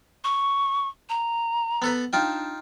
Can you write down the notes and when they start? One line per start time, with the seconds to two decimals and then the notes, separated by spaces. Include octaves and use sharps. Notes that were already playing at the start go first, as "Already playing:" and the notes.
0.24 C#6
1.09 A#5
1.82 B3 A4 B4
2.13 D4 D#4 F4 G5